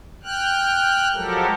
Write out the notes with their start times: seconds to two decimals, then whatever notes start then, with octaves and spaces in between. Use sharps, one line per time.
0.23 G5 F6 F#6
1.13 F3 F#3 G#3 G4 A4 A#4